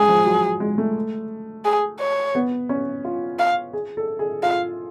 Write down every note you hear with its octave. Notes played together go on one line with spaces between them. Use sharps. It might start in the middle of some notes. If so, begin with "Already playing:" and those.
Already playing: G#3 C#4 G#4
F3
F#3
G#3
A3
G#4
C#5
B3
C#4
F4
F5
G#4
A4
G#4
F4 F5